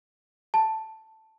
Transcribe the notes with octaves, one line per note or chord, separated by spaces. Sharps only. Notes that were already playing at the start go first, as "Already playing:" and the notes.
A5